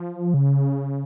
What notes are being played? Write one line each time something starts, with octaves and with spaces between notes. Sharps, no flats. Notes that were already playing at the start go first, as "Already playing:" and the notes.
Already playing: F3
C#3